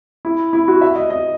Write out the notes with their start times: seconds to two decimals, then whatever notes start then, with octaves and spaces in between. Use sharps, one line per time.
0.25 E4
0.53 E4
0.68 F#4
0.81 E5
0.96 D#5
1.10 D#5